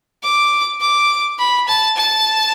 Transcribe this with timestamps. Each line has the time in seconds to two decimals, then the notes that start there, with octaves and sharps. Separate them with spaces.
0.23 D6
0.81 D6
1.39 B5
1.68 A5
1.96 A5